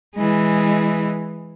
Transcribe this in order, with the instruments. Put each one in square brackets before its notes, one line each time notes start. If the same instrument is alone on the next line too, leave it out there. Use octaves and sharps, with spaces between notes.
[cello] E3 G#3